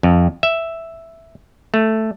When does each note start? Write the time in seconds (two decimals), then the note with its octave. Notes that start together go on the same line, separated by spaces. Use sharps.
0.03 F2
0.43 E5
1.74 A3